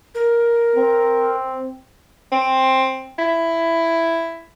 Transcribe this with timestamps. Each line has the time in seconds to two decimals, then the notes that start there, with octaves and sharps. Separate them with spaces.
0.15 A#4
0.76 C4
2.32 C4
3.19 E4